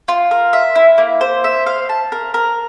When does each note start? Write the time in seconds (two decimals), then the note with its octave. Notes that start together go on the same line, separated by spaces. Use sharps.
0.08 F4
0.31 A#4
0.53 E5
0.75 E4
0.98 A#3
1.21 C5
1.44 E5
1.66 F5
1.89 A5
2.12 A#4
2.34 A#4